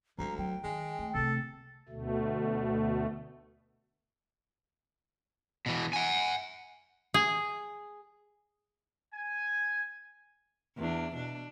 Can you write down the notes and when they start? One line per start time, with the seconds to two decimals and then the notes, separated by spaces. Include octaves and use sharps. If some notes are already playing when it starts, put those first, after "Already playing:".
0.19 D2 F#3 G#3 A#5
0.38 F#3 G5
0.64 D#3 G#3
0.99 A3
1.14 C3 A3 A4
1.89 D2 B2 A3
5.66 B2 E3
5.93 F#5 G#5
7.14 G#4
9.12 G#5
10.77 E2 D4
11.15 B2 D4